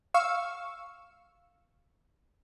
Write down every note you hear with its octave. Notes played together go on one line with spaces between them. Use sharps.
F5 C#6 E6